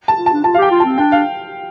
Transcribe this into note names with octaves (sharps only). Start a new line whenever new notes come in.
A5
F4
A5
D4
F4 A5
F5
G4 G5
F4
C4 A5
D4 G5
F5